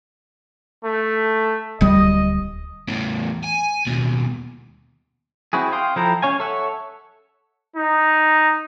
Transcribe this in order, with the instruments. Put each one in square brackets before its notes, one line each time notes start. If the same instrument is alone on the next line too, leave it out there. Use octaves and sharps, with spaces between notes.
[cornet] A3
[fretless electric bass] D1 G3 [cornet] D#5
[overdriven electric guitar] E2 A2
G#5
D#2 B2
[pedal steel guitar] C4 E4 F#4 G#4
F5 G5 C6 D#6
F3 E4 A4 G5 A#5
C#4 C#5 F5 G#5
A4 C#5 E5 F#5
[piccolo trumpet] D#4